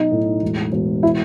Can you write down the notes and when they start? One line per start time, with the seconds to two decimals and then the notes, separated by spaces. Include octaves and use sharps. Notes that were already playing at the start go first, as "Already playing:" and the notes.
Already playing: B1 D#4
0.12 A2
0.42 E1
0.72 E1
1.03 E4